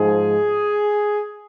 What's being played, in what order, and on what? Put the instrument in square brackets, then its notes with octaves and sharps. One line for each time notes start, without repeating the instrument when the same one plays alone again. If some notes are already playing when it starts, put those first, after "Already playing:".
Already playing: [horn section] G#2 F3 G#4